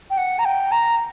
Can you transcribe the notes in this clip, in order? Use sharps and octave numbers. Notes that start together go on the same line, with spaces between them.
G5
F#5
A#5
G5
A#5